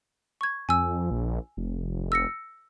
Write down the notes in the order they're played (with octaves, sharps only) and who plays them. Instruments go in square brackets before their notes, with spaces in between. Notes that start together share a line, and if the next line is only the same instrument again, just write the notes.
[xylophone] C#6 G#6
[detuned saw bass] F2 [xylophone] G#5 E6
[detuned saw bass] A#1
F1
[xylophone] E6 A#6 C#7